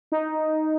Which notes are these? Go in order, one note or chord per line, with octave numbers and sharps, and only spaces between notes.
D#4